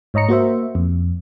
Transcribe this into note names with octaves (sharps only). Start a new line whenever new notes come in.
G#2 C#5 D#5 A#5 C#7
A#3 F#4 C5 E5
F2